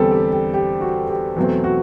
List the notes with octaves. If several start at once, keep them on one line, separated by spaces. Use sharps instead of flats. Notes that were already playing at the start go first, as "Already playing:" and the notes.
Already playing: E2 D3 G3 C4 G4 A4
G4
G4
G4
F#4
G4
E2 B2 F#3 A3 C4
F#4